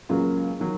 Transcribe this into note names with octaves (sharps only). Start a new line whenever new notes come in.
C#2 C#3 F#3 A#3 F4
D#3 F#3